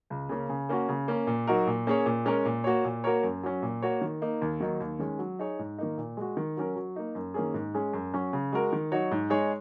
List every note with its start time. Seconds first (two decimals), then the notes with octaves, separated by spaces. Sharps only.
0.10 C#2
0.29 C#3 A#3 C#4
0.49 C#3
0.69 A#3 C#4 F#4
0.89 C#3
1.08 A#3 C#4
1.27 A#2
1.47 F#3 D#4 F#4 A#4
1.67 A#2
1.87 A#3 C#4 G#4 C#5
2.06 A#2
2.25 G#3 C#4 A#4 C#5
2.45 A#2
2.64 A#3 F#4 C#5
2.84 A#2
3.04 A#3 F#4 A#4 C#5
3.23 F#2
3.43 F#3 C#4
3.62 A#2
3.82 A#3 F#4 C#5
4.01 D#3
4.22 A#3 D#4
4.42 D#2
4.60 D#3 F#3 A#3 D#4
4.80 D#2
4.99 D#3 G#3 C#4
5.19 F#3
5.39 D#4 G#4 C#5
5.59 G#2
5.78 D#3 A#3 D#4
5.98 A#2
6.17 G#3 F#4
6.37 D#3
6.57 F#3 C#4 A#4
6.76 F#3
6.96 A#3 D#4
7.15 F#2
7.34 D#3 A#3 C#4 G#4
7.54 G#2
7.74 G#3 C#4 G#4
7.93 F#2
8.14 F#3 C#4 F#4
8.33 C#3
8.53 G#3 F#4 A#4
8.73 D#3
8.92 F#3 D#4 F#4 C#5
9.11 G#2
9.30 G#3 D#4 G#4 C#5